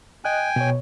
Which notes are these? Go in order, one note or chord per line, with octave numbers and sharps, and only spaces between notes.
D#5 G5 G#5 F#6
B2 C#5